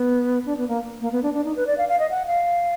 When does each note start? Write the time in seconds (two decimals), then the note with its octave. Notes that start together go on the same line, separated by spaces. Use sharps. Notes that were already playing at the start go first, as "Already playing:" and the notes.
Already playing: B3
0.46 D4
0.57 B3
0.68 A#3
1.01 A#3
1.12 B3
1.23 D4
1.34 D4
1.45 D#4
1.56 B4
1.67 D5
1.78 F5
1.89 F5
2.00 D#5
2.10 F#5
2.27 F5